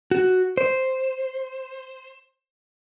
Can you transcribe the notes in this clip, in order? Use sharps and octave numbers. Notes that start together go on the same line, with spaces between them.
F#4
C5